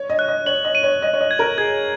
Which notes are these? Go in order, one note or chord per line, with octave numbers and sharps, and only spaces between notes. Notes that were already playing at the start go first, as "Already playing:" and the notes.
Already playing: C#5
D#5
F#6
D#5
C#5 F#7
D#5
D#7
C#5
D#5 D#7
C#5
D#5
G#6
A#4
G#4 G#6